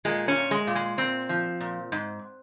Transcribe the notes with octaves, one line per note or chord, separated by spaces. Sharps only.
A#2 G#3
C#4
A#2
G#3
A#2
G#3
A#2 C4
F3
A#2
G#2